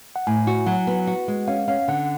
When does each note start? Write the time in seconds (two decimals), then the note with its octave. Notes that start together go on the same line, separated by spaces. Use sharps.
0.16 F#5
0.27 A2 G#5
0.47 F#4
0.66 F#3 F#5
0.87 B3
1.07 F#4
1.28 G#3
1.47 C#4 F5
1.68 C#4 F5
1.88 D3 F#5